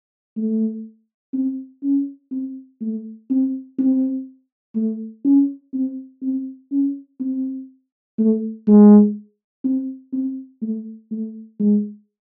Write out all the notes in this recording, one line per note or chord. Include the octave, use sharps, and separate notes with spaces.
A3
C4
C#4
C4
A3
C4
C4
A3
C#4
C4
C4
C#4
C4
A3
G#3
C4
C4
A3
A3
G#3